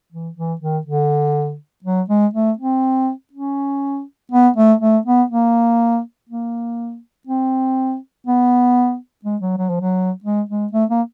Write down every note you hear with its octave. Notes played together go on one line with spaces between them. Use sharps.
E3
E3
D#3
D3
F#3
G#3
A3
C4
C#4
B3
A3
A3
B3
A#3
A#3
C4
B3
G#3
F#3
F#3
F3
F#3
G#3
G#3
A3
A#3